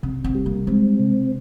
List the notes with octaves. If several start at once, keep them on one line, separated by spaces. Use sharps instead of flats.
C3 C#4
C4
G3
A#3
G#3 C4
C3